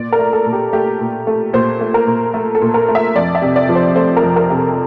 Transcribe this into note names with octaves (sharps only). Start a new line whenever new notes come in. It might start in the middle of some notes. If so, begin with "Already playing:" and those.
Already playing: A#2 D5
A#4
A3
A4
A#2
G4
A3 G4
A#2
A3
A#2 C5
A3
A#4
A#2
A3 A4
A4
A#2
A#4
A3
E5
F2 D5
E5
C3
D5
F3
C5
A3 C5
A#4
F2
A#4
C3
A4